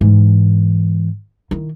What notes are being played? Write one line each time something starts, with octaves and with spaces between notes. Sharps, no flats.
G#2 E3
D#3 E4